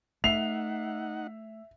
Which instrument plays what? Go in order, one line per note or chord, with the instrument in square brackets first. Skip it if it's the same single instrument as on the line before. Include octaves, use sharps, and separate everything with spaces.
[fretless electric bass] A3 [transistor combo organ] D#4 F#5 [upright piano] E5 C7 [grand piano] F7